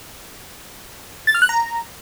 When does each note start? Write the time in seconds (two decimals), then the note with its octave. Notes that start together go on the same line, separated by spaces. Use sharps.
1.27 A6
1.35 F6
1.42 F#6
1.49 A#5